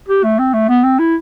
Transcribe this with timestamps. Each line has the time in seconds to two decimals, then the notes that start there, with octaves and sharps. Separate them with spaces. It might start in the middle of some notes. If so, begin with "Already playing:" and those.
0.09 G4
0.24 A3
0.39 C4
0.54 A3
0.69 B3
0.84 C4
0.99 E4